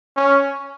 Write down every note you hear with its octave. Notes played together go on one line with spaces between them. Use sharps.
C#4